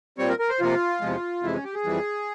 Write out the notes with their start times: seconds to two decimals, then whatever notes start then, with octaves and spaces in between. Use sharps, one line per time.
0.18 A#2 G3 C4 C#5
0.29 A#4
0.39 A#4
0.49 C5
0.60 C3 F3 A#3 F4
1.01 E2 C3 F3 G#3
1.43 F2 C3 E3 G#3 E4
1.53 C#4
1.64 G4
1.74 G#4
1.85 F2 E3 G3